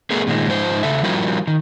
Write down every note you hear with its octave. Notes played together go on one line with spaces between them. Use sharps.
A3 B3 G#4 A#4
A#2 D#3 F#3 G#3
G#2 F3 D#4 A4 C5
C#3 A4 E5
F3 G3 E4 F#4 A#4
D#3